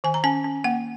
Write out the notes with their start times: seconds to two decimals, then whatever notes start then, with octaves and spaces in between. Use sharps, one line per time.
0.04 D#3 G#5
0.14 A#5
0.24 C#4 G#5
0.44 C#4
0.64 A#3 F#5